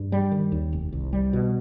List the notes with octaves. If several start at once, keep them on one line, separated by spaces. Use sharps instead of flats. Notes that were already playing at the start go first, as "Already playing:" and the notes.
Already playing: G2
G3
D#3
D#2
F1
C2
G3
B2